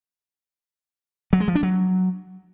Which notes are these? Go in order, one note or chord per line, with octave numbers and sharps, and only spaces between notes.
F#3
G#3
F3
D4
F#3